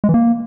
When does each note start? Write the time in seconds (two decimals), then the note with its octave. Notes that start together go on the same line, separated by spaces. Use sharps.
0.04 G#3
0.09 E3
0.14 A#3